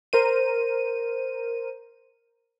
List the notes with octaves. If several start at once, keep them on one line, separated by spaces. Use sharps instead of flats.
A#4 C5 D#7